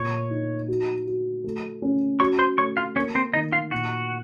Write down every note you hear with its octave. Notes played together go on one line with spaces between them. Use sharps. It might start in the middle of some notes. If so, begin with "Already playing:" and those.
Already playing: A#2 C#5 C#6
D#4
F#4
F#4
A3
C#4
F#4 C#5 C#6
C5 C6
A3 C#5 C#6
F4 F5
A#3 C#4 C#5
C4 C5
D#3 D#4 D#5
F4 F5
A#2 F#4 F#5